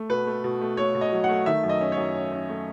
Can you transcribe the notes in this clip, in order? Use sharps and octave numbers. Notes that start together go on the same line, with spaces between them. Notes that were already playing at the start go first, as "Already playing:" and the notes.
Already playing: A3
B2 B4
A3
B2
A3
A3 C#5
B2
D#5
F#3
F#5
A3
D#3 E5
F#2
D#5
C#4
C#5
F#2
C#4
C#4
A3